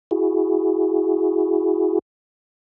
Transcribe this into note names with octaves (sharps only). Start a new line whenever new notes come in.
E4 F#4 G#4